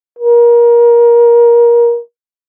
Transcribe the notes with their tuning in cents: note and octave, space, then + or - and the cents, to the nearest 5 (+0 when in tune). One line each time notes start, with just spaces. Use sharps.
A#4 +25